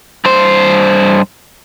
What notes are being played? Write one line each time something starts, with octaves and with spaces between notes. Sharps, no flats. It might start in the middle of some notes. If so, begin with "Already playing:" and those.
G2 C5